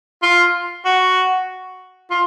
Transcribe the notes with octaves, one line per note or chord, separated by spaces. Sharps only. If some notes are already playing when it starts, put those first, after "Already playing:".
F4
F#4
F4